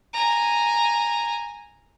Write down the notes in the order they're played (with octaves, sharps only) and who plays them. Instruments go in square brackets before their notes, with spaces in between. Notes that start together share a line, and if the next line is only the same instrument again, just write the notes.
[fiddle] G#5 A#5